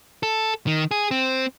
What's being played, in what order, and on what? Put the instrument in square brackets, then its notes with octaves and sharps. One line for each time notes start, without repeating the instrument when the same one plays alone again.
[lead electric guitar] A4
D#3
G#4
C4